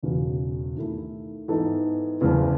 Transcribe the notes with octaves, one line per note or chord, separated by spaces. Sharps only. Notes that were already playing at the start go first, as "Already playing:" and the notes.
E1 E2 C#3 F#3
D#2 D#3 A3 E4
G#2 E3 B3 D#4 A4
F#1 E2 C#3 E3